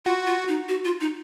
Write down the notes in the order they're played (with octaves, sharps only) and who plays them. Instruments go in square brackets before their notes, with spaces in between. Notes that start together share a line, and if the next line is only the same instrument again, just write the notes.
[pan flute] F4 [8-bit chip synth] F#4
[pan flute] F4
D#4
F#4
F4
D#4